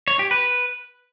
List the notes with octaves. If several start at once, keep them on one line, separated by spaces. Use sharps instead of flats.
C#5
G4
B4